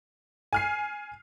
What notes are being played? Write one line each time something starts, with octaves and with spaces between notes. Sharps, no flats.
G#5 F6 C7